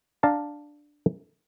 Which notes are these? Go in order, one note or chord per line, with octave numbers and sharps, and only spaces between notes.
D4 F5 A5 A#5